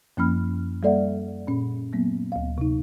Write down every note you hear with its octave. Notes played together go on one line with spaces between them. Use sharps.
F#2 F3 A#3 C#4 B5 F6
G3 A#3 A4 D5 E5 F#5
A#2 C#4
F#3 A#3 B3
D2 F5
C3 D#4